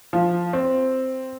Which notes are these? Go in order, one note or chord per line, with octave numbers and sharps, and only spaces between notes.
F3
C4